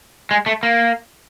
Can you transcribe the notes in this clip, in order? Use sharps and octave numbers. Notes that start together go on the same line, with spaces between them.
G#3
A3
A#3